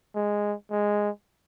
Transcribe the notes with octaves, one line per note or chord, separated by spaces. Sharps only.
G#3
G#3